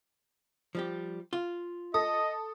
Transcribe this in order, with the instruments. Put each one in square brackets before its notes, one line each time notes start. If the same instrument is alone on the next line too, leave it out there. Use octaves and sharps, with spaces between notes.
[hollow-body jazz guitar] F3 G3 G4
F4
[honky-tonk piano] A4 [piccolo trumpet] D#5 [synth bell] D#6